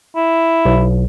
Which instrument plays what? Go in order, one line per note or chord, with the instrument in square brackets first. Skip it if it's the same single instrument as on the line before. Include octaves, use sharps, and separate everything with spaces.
[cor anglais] E4
[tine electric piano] B1